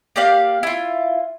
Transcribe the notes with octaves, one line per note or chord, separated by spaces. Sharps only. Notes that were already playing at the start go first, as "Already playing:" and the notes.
A#3 G4 D5 F5
E4 F4